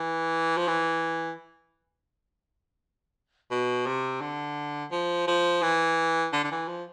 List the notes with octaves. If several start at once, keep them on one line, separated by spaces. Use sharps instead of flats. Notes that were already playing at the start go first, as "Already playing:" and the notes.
Already playing: E3
F3
E3
B2
C3
D3
F3
F3
E3
D3
D3
E3
F3